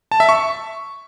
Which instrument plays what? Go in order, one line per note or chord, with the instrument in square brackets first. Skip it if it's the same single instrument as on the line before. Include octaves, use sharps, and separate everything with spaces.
[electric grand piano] A5
E5
C#6